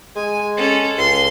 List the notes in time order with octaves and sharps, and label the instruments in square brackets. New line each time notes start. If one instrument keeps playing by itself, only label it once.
[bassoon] G#3 [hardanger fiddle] G#5
[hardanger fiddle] C#4 A4
[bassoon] C#2 [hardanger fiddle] C6